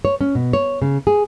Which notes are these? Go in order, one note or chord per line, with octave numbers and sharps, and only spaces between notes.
C#5
C#4
B2
C#5
C#3
G#4